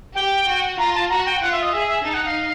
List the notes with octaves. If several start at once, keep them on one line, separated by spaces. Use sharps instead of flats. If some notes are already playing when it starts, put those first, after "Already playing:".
G4 G5
F#4
F4 A#5
A5
F#4 A#5
G5
F4 F#5
E5
D#5
G#4 E5
E5
D#4 A5
F#5
F5